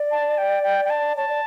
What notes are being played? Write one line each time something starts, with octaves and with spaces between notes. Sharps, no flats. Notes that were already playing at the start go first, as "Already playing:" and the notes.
Already playing: D5
A5
G5
G5
G5
A5
C#5 A5
D5